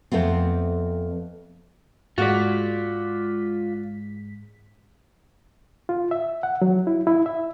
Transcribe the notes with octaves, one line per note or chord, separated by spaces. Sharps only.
F2 A3 B3 C4
G#2 G#3 F4 F#4 D5 B6
F4
E5
F#5
F#3
E4
E4
E5